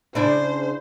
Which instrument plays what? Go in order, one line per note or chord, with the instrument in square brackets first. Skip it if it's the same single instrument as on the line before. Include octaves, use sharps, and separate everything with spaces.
[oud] C#3 D4 E4 [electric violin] C5